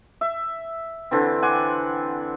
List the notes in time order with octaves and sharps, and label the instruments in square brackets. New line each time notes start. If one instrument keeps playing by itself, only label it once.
[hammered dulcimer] E5
D3 E3 C4
F#5 G#5 C6 D6